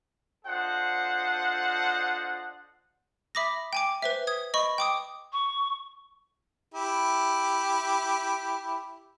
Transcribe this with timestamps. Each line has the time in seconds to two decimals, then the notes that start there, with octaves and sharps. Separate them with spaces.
0.45 D4 F4 A4 C5 D#5 F#5
3.35 E5 B5 D6 D#6 A#6
3.73 G5 G#5 D6
4.02 B4 C5 E5
4.27 D#6 G#6
4.54 D#5 B5 C#6
4.78 G5 D6 D#6
5.33 C#6
6.75 E4 G4